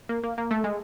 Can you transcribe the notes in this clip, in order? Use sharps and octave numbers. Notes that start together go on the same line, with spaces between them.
A#3
A#3
A#3
A3
G#3